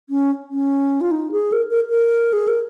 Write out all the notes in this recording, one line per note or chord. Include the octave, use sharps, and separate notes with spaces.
C#4
C#4
F4
D#4
G#4
A#4
A#4
A#4
G#4
A#4